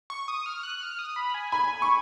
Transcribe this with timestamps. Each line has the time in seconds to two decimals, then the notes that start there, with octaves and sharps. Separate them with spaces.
0.10 C#6
0.28 D#6
0.46 F6
0.63 F#6
0.81 F6
0.99 D#6
1.16 B5
1.34 G#5
1.52 G#5 B5
1.82 C#6